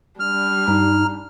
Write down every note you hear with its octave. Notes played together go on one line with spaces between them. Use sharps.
G3 D4 F6
G2 D#4